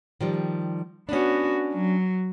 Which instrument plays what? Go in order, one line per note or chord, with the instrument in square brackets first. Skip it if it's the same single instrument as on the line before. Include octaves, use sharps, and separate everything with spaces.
[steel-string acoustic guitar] D#3 F3 G3
[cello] B3 F#4 [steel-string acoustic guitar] C#4 D4
[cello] F#3